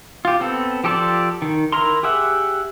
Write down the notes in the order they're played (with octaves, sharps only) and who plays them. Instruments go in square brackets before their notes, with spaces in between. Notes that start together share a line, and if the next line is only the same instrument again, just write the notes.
[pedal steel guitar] F4 G4
B3 C4 A4
F3 G4 A4 C5 D5
D#3
E4 A#4 A#5 C6
G4 G#4 E5 F#5